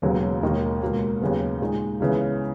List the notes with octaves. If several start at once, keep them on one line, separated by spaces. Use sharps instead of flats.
E1 D#2 C#3 F#3 B3
E1 D#2 D#3 A#3 D#4
C#2 B2 A#3
D#2 C#3 F#3 B3
A#2 G#3 D#4
C#2 C#3 E3 B3